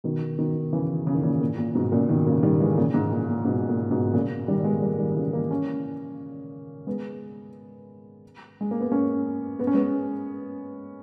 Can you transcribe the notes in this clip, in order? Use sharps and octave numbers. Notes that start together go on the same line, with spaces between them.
B2 D#3
B2 D#3
C#3 E3
C#3
D#3
A#2 C#3
A#2
A#2
G#2 B2
A#2 C#3
B2 D#3
A#2 C#3
D#3 G3
E3 G#3
A#2 C#3
G#2
A#2
A#2
G#2 B2
A#2
G#2 B2
A#2 C#3
D#3 G3
G#3 B3
G3 A#3
D#3 G3
C#3 E3
G3 A#3
A#3 C#4
G#3 B3
G#3
A#3
B3
A#3 C#4
B3
C#4
G#3 B3